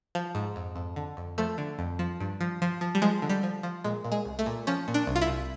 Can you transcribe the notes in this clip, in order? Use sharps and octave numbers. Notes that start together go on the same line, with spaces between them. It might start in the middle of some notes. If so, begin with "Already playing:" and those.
F3
G#2
F2
F2
D3
F2
F3 A3
D3
F2
F3
G2
F3
F3
F3
G3
F3 G#3
D3
G3
F3
F3
A#2 G#3
A#2
G#3
C2
A3
A#2
F3 C#4
A#2
D4
C2
F4
E4
C2